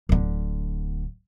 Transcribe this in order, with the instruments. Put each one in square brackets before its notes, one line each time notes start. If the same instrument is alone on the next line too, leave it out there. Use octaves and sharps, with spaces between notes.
[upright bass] D1 D3